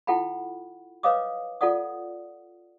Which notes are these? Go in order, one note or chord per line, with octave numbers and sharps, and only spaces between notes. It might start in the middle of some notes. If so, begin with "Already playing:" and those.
E4 F4 A4 F#5 G5 B5
B4 C#5 D#5 F5 D6 D#6
F4 A4 D5 F#5 D#6